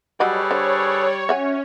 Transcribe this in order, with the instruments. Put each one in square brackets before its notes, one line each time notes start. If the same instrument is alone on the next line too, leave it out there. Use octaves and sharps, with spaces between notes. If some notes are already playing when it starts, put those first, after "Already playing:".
[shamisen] F#3 D#5 F#5 [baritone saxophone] G3 [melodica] G#4 A4 B4 [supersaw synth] C#5
[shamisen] D3 C5
[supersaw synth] C#4 [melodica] F#4 [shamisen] E5 F#5 G#5